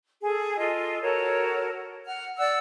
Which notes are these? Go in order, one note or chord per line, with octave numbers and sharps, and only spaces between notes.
G#4 A4
F4 A4 D#5
F#4 A4 A#4 C#5
F#5 F6
D5 F#5 E6